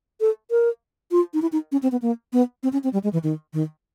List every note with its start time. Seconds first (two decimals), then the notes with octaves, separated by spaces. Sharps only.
0.21 A4
0.51 A#4
1.11 F4
1.34 D#4
1.42 E4
1.52 D#4
1.72 C#4
1.83 C4
1.92 B3
2.02 A#3
2.33 B3
2.63 C4
2.73 C#4
2.84 C4
2.93 G3
3.04 G#3
3.13 E3
3.24 D#3
3.53 D#3